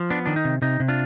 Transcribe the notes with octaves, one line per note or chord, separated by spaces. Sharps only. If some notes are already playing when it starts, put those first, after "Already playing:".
Already playing: F3
B3 D4
D#3 D4
D#4
C3
C3 D#4
C3
D4 F4